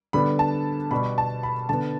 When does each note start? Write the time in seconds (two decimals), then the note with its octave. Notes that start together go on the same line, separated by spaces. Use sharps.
0.13 D3 G3 B3 B5
0.39 A5
0.91 B2 G3 B3 B5
1.18 A5
1.43 B5
1.69 D3 B3 A5